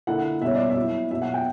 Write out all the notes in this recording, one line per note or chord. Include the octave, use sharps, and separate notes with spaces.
D3 A#3 E4 F#5
B2 G3 A#3 C#4 E5
D5
E5
F#3 A#3 E4
B2 F#3 A#3 E5
F#5
G5